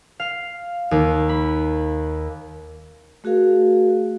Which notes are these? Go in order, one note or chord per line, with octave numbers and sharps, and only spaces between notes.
F5
D#2
B5
A3 F#4 G#4 A#4 F5